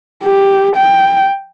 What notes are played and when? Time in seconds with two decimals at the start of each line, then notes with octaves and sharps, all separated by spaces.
0.24 G4
0.77 G5